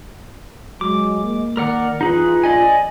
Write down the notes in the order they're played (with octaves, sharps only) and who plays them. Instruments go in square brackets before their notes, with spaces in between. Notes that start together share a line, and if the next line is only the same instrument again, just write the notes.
[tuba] F#3 [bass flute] G#3 [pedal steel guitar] D6
[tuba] A#3
[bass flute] D#3 [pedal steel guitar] A#4 D5 F#5
[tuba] E2 [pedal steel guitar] D#4 G#4 B4 [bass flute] F4
[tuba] A#1 [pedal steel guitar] D5 D#5 G#5